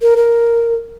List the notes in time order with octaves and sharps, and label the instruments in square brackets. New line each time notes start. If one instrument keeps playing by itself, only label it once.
[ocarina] A#4
A#4